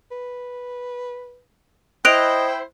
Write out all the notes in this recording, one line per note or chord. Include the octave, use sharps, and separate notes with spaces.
B4
E4 C5 D#5 G5 F#6 D7 F7